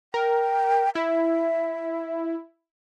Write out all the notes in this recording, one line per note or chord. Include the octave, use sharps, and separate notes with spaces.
A#4 G5
E4 E5